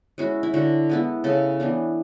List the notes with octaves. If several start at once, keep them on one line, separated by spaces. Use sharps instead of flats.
G#3 C#4 E4 F#4
E4
D3 F#4
G#3 B3 E4
C#3 A4
E3 B3 D4